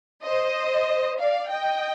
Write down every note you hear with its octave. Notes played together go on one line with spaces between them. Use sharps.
C5 D#5
D5 F5
D#5 G5